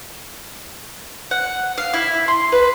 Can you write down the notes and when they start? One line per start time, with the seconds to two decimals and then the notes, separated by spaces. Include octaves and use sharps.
1.31 F#5
1.78 F5
1.93 E4
2.28 C6
2.52 B4